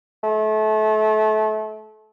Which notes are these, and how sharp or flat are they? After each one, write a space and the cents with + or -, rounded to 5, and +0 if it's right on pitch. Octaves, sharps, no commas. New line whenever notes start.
A3 -30